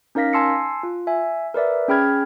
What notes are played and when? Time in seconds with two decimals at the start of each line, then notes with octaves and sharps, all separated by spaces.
0.15 C#4 D#4 A#4 F5 A#6 B6
0.33 G#5 A5 C6 E6 C7 C#7
0.83 F4
1.07 E5 G#5
1.54 A#4 B4 D5 E5
1.88 C#4 G#4 G5 B5 F6 G#6